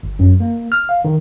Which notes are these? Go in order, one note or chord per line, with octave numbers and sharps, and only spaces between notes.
G1
F#2
A#3
F6
F5
D#3